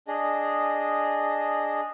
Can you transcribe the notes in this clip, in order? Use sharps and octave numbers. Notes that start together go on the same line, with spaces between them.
D4 G#4 D#5